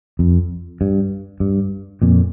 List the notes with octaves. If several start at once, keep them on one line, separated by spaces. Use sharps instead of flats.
F2
G2
G2
F2 A#2